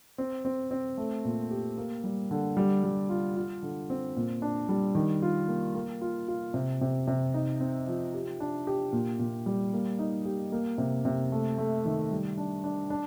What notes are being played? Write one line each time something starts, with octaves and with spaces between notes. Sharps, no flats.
C4
C4
C4
A3
A#2
G4
A#3
G3
D3
G3
G3
F4
F4
D3
C4
A#2
D4
G3
D#3
F4
A#3
A#3
F4
F4
C3
C3
C3
D#4
C4
F3
G4
D4
G4
A#2
A#2
G3
A#3
D#4
G4
A#3
C3
C3
A3
A3
D#3
G3
D4
D4
D4